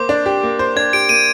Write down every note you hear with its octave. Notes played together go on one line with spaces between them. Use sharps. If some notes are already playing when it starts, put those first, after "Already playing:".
Already playing: A#3 C5 D6
D4
G4
A#3
C5
D4 G#6
G4 D7
A#3 D#7